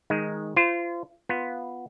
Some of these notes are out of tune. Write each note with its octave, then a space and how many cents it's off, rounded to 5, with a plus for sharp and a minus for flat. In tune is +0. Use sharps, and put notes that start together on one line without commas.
D#3 +15 G#3 +0 D#4 +0
F4 -30 C5 -20
B3 +0 F4 +0